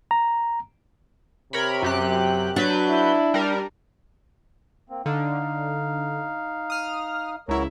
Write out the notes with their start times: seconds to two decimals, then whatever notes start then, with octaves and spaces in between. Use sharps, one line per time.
0.11 A#5
1.53 C3 A#4 C#5 B5
1.82 F#2 G4 F#6
2.56 F#3 D4 B4 G6
2.89 E4
3.34 G3 A#4
4.90 A#3 C4
5.06 D3 D#4 F5
6.70 D#6 F6
7.48 C#2 F#3 E4 A#4 C#5